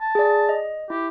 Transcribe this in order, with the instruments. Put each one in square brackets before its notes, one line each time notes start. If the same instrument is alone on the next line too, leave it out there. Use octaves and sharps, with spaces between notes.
[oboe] A5
[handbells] G#4 D5
D#5
[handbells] E4 [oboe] G4